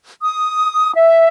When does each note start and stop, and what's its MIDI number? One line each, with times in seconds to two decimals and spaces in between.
0.21 0.94 87
0.95 1.27 76